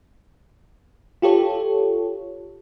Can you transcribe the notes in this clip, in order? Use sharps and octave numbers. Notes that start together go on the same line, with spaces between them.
F4 G4 A4 C#5